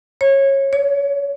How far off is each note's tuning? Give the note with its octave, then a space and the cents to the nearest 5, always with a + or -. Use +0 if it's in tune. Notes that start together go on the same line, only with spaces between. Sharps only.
C#5 -20
C#5 +30